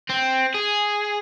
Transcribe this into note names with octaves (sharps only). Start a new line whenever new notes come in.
C4
G#4